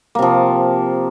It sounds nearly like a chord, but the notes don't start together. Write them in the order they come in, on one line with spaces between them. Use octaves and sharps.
A#3 C3 F3